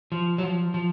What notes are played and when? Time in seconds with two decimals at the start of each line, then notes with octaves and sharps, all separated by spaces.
0.12 F3
0.38 F#3
0.43 F3
0.74 F3